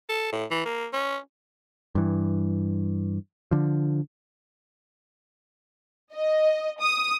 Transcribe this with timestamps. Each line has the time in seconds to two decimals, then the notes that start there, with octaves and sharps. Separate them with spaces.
0.09 A4
0.32 A2
0.51 E3
0.65 A#3
0.93 C#4
1.95 G2 E3
3.51 D3 F3
6.14 D#5
6.79 D#6